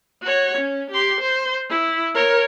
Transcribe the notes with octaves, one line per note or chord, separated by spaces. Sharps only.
F#4 C#5
C#4
G4 C6
C5
E4
A#4 C#5